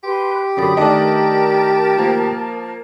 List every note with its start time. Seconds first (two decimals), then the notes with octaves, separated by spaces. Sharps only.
0.04 G4 B4 C6
0.57 F#2 D3 D5 B5 D#6
0.77 D#3 A3 D4 A#4 D5 D#5 A5
1.97 F3 A#3